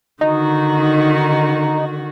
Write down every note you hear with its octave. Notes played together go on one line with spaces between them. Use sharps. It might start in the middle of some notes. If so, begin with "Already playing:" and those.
D3 D#3 D#4 F#4